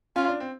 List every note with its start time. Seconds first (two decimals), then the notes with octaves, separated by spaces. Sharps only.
0.16 C#4 F4
0.28 D4
0.40 C4